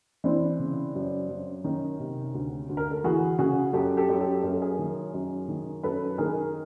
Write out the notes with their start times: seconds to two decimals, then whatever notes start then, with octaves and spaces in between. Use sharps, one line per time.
0.24 E3 C4 D4
0.59 C#3
0.95 F#2
1.30 F#2
1.64 D#3 C#4 D#4
2.00 C3
2.34 D2
2.69 D2
2.77 A#4
2.91 A4
3.04 E3 F#4 G#4
3.39 C#3 F#4 G#4
3.73 F#2 G4 A4
3.97 G4 A4
4.09 F#2
4.20 G4 A4
4.43 F#2 A#4
4.53 A4
4.62 G#4 A#4
4.79 D#3
5.14 F#2
5.48 D#3
5.83 F#2 A4 B4
6.18 D#3 G#4 A#4